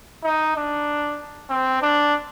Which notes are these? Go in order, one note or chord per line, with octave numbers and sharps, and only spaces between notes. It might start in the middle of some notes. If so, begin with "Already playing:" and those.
D#4
D4
C4
D4